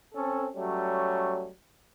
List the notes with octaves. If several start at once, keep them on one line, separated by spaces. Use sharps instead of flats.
C4 C#4 A4
F#3 G3 A3 C#4